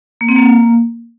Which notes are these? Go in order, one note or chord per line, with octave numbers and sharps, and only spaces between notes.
A#3
C4
A#3